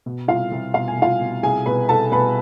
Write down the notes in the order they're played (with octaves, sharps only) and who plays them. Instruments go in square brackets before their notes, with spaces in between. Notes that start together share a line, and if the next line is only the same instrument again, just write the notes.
[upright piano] B2
C2 F4 F5
C2
B2 F5
G#5
C2 F4 F5
B2
C2 G#4 G#5
B2 B4 B5
C2 A4 A5
B2 B4 B5